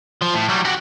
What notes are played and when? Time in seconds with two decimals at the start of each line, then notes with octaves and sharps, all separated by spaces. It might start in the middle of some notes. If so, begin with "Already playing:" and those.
0.21 F3
0.34 A2
0.49 F#3 G3
0.65 F#4 G4